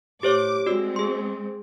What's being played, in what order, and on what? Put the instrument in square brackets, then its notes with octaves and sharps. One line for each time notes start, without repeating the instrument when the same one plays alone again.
[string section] A2 D6 [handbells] G4 C5 C#5
[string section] G#3 C4 [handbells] F#4 D5 E6
[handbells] G#4 C6